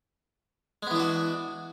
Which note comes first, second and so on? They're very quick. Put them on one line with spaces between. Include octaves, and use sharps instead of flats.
G#3 B3 E3 D4 F#4